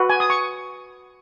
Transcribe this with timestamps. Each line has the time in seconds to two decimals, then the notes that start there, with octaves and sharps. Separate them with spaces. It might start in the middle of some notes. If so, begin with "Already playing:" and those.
Already playing: F#4 B4
0.10 G#5
0.20 D#6
0.30 C#6